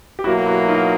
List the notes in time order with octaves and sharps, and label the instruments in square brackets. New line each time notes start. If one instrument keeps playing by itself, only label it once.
[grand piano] G4
[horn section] B2 F#3 A#3 [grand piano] E4 F#4
[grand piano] E4 F#4
D#4 F4